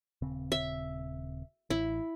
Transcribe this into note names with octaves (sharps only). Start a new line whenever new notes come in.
D#1 C#3 C4
E5
A1 E4